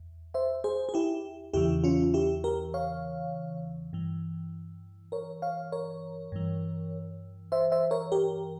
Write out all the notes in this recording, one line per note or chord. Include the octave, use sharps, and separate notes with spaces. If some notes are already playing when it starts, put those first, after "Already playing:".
Already playing: E2
C5 E5
G#4 C5
G#4
E4 G4
E2 C#3 E3 E4 G4
C#4 F4
E4 G4
G4 A#4
C#5 F5
G2 E3
A#4 C#5
C#5 F5
A#4 C#5
G2 E3
C5 E5
C5 E5
A#4 C#5
G4 A#4